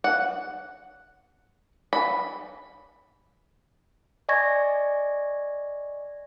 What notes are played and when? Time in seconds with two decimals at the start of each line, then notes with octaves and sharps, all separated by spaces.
0.04 F#5
1.93 B5
4.29 D5 D#5 G#5 C#6 G#6 A#6